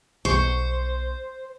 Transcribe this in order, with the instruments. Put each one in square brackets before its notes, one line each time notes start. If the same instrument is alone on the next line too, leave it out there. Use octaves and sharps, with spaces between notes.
[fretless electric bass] B1 B2 [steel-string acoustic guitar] C5 [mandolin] C#6